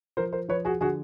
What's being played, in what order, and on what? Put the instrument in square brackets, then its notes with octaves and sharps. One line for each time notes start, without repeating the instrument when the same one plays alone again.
[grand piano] F3 A#4 C5
A#4 C5
F3 B4 C#5
F#4 G#4
D3 F#4 G#4